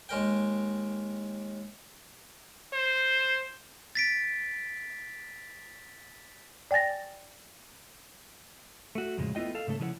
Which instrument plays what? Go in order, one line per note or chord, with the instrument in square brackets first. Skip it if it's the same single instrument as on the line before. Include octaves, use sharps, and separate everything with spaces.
[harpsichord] D#2 G#3 A#4 G5
[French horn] C5
[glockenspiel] A6 B6 D7
[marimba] D5 G5 G#5 A6 A#6
[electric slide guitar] A3 F#4
F2 A2 C#3 G#3
A3 B3 E4 F4 D#5 G5
A4 F5
G#2 C#3 A3 A4
C#3 F3 E4 B4 F#5